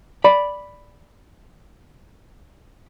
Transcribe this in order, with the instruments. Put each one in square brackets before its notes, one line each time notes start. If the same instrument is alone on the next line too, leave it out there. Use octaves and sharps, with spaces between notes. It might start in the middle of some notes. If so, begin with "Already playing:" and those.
[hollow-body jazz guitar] D5 B5